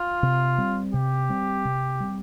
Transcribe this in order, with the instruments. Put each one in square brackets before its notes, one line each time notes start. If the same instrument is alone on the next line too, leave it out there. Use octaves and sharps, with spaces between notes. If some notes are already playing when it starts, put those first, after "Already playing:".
Already playing: [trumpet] F4
[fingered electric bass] C3
G3 C4
[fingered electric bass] C3 [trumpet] G4
[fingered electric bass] G3 C4
C3
G3 C4